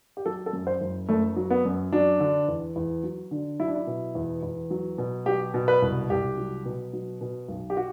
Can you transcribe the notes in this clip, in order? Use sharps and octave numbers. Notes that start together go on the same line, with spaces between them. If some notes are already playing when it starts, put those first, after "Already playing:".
G4
F#3 A4
A4
F#2
C5
F#1
F#1 A3
F#3
B3
F#2
F#3 D4
D3
E2
E2
F#3
D3
F#3 E4
D4
E4
B2
E2
E2
F#3
B2
F#3 G4
B2
B4
C2
C2 G4
F#3
B2
F#3
B2
B1
G4
F#4